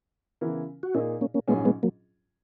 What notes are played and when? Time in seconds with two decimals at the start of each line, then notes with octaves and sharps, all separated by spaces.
0.41 C#3 E3 B3 E4 A#4
0.83 F#4
0.94 A#2 A#3 C#4 D#4 E4 G#4 D#5
1.21 A#3 C#4
1.34 A#3 C#4
1.47 A#1 G#2 F#3 G#3 B3 C#4 G#4
1.65 G#3 B3
1.83 F#3 A#3